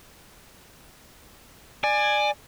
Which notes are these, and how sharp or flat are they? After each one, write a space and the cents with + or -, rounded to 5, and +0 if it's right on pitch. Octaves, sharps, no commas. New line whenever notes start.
D5 +20 G#5 +0